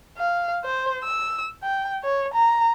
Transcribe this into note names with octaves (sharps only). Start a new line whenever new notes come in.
F5
C5
E6
G5
C#5
A#5